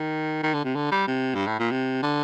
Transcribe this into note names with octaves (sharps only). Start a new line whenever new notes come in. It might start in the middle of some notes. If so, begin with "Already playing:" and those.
Already playing: D#3
D#3
D3
C3
D3
G3
C3
G2
A2
A#2
C3
D3